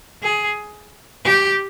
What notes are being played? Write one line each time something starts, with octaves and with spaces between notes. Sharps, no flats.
G#4
G4